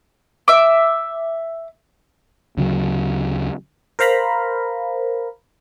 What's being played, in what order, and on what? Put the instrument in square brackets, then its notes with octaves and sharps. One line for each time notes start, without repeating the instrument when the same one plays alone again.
[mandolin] E5 D6
[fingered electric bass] D2 C#3 E3 F#3
[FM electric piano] A#4 C5 F5 A#5 B5